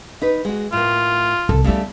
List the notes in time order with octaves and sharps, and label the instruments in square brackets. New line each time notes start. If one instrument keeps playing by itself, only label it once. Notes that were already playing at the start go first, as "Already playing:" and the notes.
[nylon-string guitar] D#4 B4
G#3 F#4
[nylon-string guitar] A2 A#3 [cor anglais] F4
[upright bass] C2 [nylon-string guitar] A4
[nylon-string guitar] C#3 G3 A3 [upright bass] B3 E4